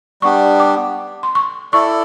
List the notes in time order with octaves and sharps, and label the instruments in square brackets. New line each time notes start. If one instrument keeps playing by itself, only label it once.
[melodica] G3 B3 D4 G4 [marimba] C#6
[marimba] D6
C6
C#6
[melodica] E4 A4 D5 [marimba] C#6